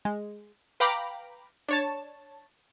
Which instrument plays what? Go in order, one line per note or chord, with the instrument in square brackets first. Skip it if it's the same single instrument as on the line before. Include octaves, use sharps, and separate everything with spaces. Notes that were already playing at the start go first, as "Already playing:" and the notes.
[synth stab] G#3
B4 F5 G5 A#5 B5 D6
D4 C#5 A5